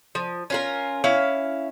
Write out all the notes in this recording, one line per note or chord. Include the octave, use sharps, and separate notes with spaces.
F3
C#4 F4 A#4
C#4 E4 F5